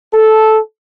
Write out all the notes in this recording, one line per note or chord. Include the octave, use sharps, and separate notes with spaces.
A4